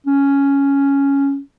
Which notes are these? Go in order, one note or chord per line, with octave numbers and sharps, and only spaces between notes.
C#4